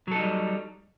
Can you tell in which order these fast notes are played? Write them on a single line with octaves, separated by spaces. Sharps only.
F#3 A4 D#4 G3